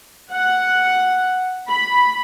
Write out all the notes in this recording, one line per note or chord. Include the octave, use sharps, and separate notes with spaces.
F#5
B5